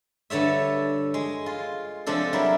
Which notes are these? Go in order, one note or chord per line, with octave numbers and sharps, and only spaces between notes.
G2 D3 A4 C#5 E5
G#3
F4
C3 F3 G#3 D4 A4
F#3 G3 E4 A#4